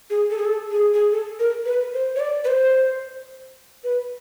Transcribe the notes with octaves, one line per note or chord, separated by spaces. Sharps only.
G#4
A4
G#4
A4
G#4
G#4
A4
A#4
B4
C5
C#5
D5
B4
C5
B4